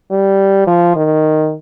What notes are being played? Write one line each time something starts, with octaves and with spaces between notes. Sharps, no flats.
G3
F3
D#3